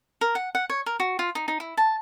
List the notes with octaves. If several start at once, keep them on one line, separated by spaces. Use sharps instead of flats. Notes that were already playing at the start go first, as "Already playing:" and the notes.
A#4
F#5
F#5
C#5
A#4
F#4
F4
D#4
D#4
E4
A5